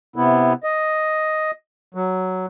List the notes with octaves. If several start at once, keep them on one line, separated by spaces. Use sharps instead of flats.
C3 B3 E4
D#5
F#3